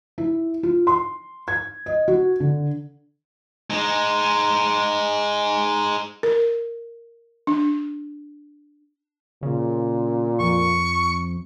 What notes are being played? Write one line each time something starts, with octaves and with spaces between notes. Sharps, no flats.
E4
F4
C6
G#6
D#5
F#4
D3
G#3 D#4
A#4
D4
A#2 C#3
F2 C#6